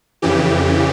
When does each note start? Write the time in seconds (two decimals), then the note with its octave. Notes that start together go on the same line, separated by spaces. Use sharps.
0.22 F2 C#3 E3 G4